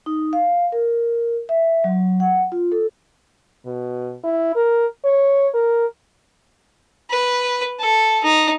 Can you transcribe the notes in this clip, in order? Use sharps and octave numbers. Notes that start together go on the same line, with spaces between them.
D#4
F5
A#4
E5
F#3
F#5
F4
A4
B2
E4
A#4
C#5
A#4
B4
A4
D#4